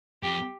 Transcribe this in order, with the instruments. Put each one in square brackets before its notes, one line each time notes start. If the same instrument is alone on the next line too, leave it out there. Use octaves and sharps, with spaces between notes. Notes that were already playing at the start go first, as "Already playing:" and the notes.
[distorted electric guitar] F2 [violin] G4